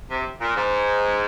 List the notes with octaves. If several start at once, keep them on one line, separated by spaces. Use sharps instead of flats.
C3
A#2
G#2